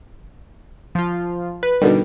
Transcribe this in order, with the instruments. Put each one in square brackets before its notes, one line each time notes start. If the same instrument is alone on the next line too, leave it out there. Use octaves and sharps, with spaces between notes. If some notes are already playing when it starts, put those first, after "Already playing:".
[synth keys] F3 F4
[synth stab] B4
[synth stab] B2 D3 D#3 [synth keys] G3